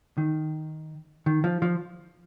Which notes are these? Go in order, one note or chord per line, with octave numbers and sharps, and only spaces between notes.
D#3
D#3
F3
F3